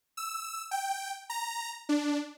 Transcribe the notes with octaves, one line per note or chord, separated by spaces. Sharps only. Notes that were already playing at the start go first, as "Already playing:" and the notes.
E6
G5
A#5
D4